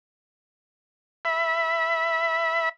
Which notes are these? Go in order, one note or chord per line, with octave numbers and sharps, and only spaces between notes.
E5 B5